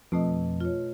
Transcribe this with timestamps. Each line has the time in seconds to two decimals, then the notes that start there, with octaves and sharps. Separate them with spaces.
0.12 F2 B2 A3 D#5
0.60 F4 C#5